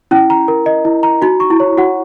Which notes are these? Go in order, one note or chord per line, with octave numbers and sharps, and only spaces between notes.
C#4 E4
A#5
A#4
D#5
E4
A#5
D#4 F#4
C#6
E4
C#5
F#4 F#5